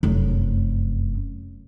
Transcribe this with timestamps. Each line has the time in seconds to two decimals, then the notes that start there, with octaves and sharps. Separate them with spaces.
0.03 F1 F#2